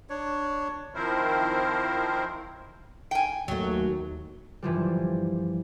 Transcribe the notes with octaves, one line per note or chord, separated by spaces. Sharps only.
D4 C#5
D#3 F3 C4 E4 A#4 C5
G5 G#5
D#2 F#3 A3
G2 E3 F3 G3